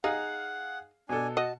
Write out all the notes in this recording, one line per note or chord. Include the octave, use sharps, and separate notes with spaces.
D#4 G#4 F5 F#5
B2 D4 A4 G#5
F#4 D#5 A5